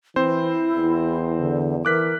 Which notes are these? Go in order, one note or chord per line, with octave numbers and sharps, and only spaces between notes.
E3 C4 E4 C5
E2
D3
E3 A#4 D6 F#6 B6